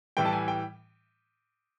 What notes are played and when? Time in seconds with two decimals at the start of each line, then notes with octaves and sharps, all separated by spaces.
0.17 A2 E3 G3 G5
0.25 A5
0.33 G#5
0.48 G5